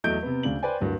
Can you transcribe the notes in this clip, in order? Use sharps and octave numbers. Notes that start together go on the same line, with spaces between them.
E2 F#3 A3 D#5 G6 D7
C3 B3
D2 C#3 D4 F#7
B4 C5 D5 G5 G#5
D1 G2 F#4 A#4